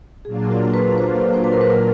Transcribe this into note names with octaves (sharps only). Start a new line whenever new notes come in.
A#2 F#3 A#3 D4 F4 G#4
A#4
B4
C5
C5
B4
A#4
B4
A#4